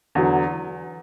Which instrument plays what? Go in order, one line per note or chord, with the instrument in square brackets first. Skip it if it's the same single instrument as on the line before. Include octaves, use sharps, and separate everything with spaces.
[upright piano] E2 D3 F#3